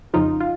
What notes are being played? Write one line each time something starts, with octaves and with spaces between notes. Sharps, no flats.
F2 C#3 F3 D#4 F4
F4